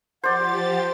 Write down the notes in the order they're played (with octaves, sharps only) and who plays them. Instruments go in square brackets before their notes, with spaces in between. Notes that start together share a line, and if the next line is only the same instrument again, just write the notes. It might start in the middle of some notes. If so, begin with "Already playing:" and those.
[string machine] F3 G4 A6 [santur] C5 D5 [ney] F#5